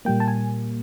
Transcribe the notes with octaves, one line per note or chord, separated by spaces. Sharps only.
A#2 G3 A#3 G5
A5
G#5